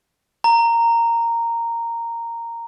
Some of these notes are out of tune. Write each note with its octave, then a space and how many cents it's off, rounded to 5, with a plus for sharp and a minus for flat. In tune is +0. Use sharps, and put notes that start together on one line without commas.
A#5 -10